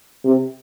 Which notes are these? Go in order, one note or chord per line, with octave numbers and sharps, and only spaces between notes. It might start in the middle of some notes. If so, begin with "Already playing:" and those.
C3